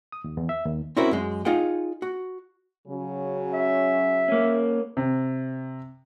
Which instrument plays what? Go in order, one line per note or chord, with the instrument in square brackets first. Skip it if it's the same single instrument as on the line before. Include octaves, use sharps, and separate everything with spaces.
[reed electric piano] D#6
D#2
E2
E5
D#2
[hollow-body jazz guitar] C4 C#4 E4 F#4 A#4 C5
F#2 G#3
D#4 F4 G#4 F#5 G5
F#4
[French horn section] C#3 F#3
[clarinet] E5
[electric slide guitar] A#3 C#4
[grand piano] C3